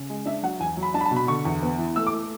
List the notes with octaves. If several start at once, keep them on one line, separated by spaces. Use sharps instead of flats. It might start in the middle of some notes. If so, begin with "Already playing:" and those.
Already playing: C#3
G#3
D4 E5
F#3 F#5
E2 G#5
F#3
B5
D4 A5
B5
A5
B2
B5
D3 C#6
E2
B3
E3
A3 E6
D6
A3